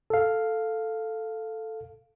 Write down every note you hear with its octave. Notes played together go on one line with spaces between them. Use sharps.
A4 F5